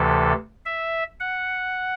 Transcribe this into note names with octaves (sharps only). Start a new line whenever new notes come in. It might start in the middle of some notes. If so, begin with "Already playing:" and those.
Already playing: D2 C3 E3 A4
E5
F#5